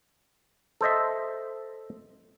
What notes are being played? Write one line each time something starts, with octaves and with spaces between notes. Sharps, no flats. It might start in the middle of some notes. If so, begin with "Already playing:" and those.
A4 C5 D#5 E5